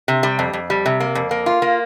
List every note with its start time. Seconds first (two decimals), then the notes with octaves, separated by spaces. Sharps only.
0.08 C3
0.23 G3
0.39 F2
0.53 F2
0.70 G3
0.86 C3
1.00 A#3
1.15 F2
1.31 A#3
1.46 F4
1.62 A#3